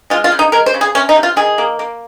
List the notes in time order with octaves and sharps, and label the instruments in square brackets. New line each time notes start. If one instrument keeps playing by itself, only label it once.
[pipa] G#3 F4
F4
C#3
D#4
G#3 A#4
C5
C#3
G#4
C3 C#4
D#4
C3
F4
D#3 G#4
A#3
A#3